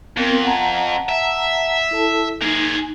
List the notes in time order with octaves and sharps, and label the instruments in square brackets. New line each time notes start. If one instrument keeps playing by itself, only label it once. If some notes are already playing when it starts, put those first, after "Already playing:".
[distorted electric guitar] F2 [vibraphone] B3 C4 A#4
[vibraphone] F#5 A5 A#5
[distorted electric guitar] E5
[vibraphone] E4 A4 A5
[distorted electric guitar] A#3 G#4 [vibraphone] D#4